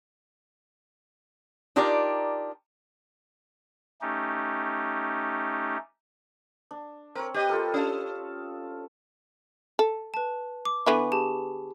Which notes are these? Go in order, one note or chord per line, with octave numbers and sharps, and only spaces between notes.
D4 D#4 F4 G4 A#4 D5
A3 C#4 D#4 G4
D4
C4 A#4 C#5
G4 B4 D#5
F4 A4 A#4
C#4 D#5 F5 A5
A4
B4 A5
D6
D3 B3 E4 G#5 B5 C#6
G4 G#4 A5